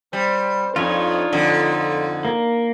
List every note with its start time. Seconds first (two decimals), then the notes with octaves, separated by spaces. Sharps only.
0.13 G3 C5
0.76 F2 D4 D#4 F4 C#5
1.32 F2 D3
2.25 A#3